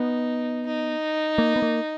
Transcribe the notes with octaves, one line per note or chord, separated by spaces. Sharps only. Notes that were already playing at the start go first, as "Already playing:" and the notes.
Already playing: B3 D#4
D#4
A#3
B3
A#3